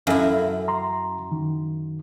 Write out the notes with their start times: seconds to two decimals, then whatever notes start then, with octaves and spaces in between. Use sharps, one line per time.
0.07 F#2 E4 A4 F5
0.68 A#5 C6
1.32 D#3